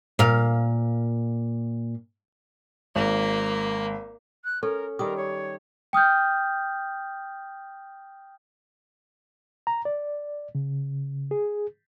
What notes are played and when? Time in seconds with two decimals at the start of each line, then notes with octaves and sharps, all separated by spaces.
0.19 A#2 F5
2.96 G#1 A#3
4.44 F#6
4.63 C#4 A4 A#4
4.99 D#3 G3 G4 A#4 D#6
5.16 C#5
5.93 G5 D#6 F6 G6
9.67 A#5
9.85 D5
10.55 C#3
11.31 G#4